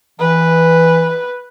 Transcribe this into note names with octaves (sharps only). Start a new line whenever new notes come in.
E3 B4